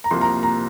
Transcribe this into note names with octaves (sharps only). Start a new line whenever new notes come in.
A#5
C2 C3 F3 A#3 C6
A#5
A#5